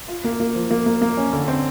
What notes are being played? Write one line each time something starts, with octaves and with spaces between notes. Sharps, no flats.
F4
A#3
A#3
F3
A#3
A#3
A#3
C#4
D3
C4